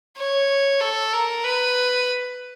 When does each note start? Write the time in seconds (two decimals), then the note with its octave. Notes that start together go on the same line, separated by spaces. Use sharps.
0.17 C#5
0.81 A4
1.13 A#4
1.44 B4